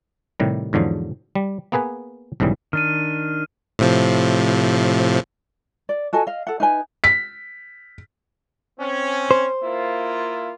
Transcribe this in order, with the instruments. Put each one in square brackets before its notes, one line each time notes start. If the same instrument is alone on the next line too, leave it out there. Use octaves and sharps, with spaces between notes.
[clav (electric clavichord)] A2 C3 D#3 G3
E2 G#2 D3 F3 F#3
G3
A#3 B3 G#4 B4 G#5
B1 G#2 C#3 E3 G3
[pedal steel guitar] D#3 D4 [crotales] F6 D#7
[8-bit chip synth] A2 C3 F3
[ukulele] D5
F#4 A4 D#5 G#5
D#5 F5
A4 F#5
D#4 B4 G#5
[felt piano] B6
[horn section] C4 C#4
[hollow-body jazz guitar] C5
[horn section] A#3 E4 F4